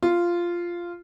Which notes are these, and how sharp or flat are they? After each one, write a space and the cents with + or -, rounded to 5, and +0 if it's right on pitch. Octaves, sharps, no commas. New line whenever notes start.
F4 -10